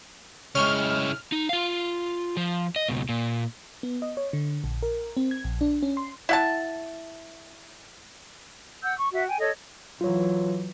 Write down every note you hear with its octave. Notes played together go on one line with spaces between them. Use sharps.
C#3 G#3 E4 C#5 G5 C#6 F6
D#4
F4 F5
F3
D#5
C#2 B2
A#2
B3
D#5
C#5
D3
A#1
A#4
C4
G#6
A#1
D4
C#4
C6
E4 F#5 A5
F#5 E6 G6
C#6
F#4 E5 F#5
G5 G#5
A4 C#5 D#5
E3 F#3 F4 C#5